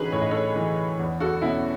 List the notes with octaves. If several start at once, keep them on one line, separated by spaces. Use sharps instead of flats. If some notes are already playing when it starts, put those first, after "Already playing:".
Already playing: A2 E3 C#4 D#4 F#4 G#4 B4
A2 C#5
D#5
A4 C#5
E3
E2
F#4 A4
B2 C#4 E4